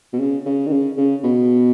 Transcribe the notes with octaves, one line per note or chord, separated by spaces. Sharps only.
B2
C#3
C#3
D#3
C#3
C#3
B2